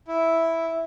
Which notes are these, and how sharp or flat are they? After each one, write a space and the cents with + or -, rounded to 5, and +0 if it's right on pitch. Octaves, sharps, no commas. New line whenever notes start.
E4 -5